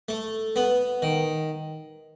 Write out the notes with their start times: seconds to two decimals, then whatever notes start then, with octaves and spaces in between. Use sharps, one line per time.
0.09 A3
0.56 B3
1.02 D#3